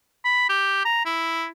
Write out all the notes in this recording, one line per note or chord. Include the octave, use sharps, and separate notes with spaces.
B5
G4
A#5
E4